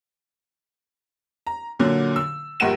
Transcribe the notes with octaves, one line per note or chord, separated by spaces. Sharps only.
A#5
A#2 D3 F#3
E6
A#1 G2 A#4 F#5 E7